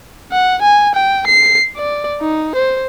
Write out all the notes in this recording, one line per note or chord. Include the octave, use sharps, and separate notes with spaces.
F#5
G#5
G5
C7
D5
D#4
C5